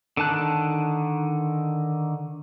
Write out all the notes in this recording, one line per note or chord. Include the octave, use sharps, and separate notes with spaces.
D3 D#3 A5 F#6